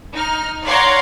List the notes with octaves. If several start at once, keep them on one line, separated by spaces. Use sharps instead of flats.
D#4 F6
C#5 D5 F5 F#5 A#5 C6